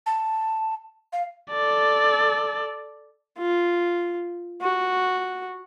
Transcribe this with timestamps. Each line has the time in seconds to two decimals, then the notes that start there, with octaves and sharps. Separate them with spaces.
0.06 A5
1.13 F5
1.51 A4 D5
3.38 F4
4.61 F#4